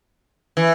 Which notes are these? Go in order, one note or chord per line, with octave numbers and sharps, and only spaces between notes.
E3